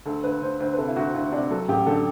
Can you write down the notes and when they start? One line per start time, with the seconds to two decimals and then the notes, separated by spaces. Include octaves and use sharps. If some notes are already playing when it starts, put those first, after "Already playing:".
0.06 D2 A4
0.24 D2 B4
0.42 D2 C5
0.60 D2 C5
0.73 B4
0.78 C3 A4
0.88 E4
0.96 D2 F#4
1.14 D2 E4
1.32 C3 D4
1.50 F#3 A4
1.68 A1 G4
1.86 D3 A4